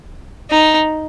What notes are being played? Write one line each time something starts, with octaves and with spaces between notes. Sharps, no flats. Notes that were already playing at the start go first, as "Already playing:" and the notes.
D#4